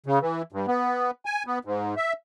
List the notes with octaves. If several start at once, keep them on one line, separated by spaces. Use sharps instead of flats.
C#3
E3
G2
B3
G#5
B3
G#2
E5